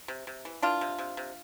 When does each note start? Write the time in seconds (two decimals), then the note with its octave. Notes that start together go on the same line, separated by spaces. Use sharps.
0.08 C3
0.27 C3
0.45 E3
0.62 E3 D4 F4
0.81 C3
0.98 C3
1.17 C3